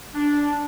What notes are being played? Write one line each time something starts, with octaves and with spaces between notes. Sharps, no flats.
D4